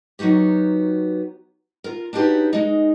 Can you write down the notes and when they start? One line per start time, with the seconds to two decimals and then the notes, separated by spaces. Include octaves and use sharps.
0.19 F#3 B3 D#4 F#4 G4
1.84 F4 A#4
2.13 D4 D#4 F#4 G4 B4 C#5
2.53 G#3 D#4